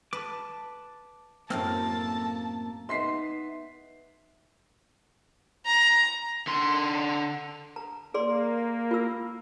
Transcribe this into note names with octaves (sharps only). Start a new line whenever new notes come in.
B4 A5 D6
F#2 A2 A#3 C4 A5 E6 F6
B3 D#4 E5 C6 B6 C7
A#5
D3 C6
A#5
A#3 G#4 D5 C6
F4 E6